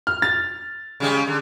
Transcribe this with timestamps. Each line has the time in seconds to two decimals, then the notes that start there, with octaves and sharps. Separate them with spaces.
0.07 F6
0.22 A6
1.00 C#3 G3 G#3
1.27 D3